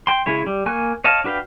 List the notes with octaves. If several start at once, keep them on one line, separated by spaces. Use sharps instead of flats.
G5 C6
C#3 G#3 E4 C#5
G3
A#3 G#5 C#6 F#6
C#5 D#5 F5 A5
D4 F#4 B4 F5 G5